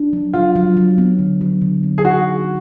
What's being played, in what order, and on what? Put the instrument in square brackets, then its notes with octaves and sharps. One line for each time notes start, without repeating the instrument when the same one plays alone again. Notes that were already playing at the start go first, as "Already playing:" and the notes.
Already playing: [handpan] D4
F#3
[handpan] F#3 [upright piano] F4
[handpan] F#3
F#3
B3
D3
F#3
D3
B3
[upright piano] G#4
[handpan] D#4 [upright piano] F#4